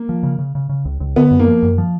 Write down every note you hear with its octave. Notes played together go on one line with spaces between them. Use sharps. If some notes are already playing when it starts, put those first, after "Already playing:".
Already playing: A#3
F3
C#3
C#3
C#3
C#3
C#2
C#2
D3 B3
F#2
A#3
F3
F#2
F3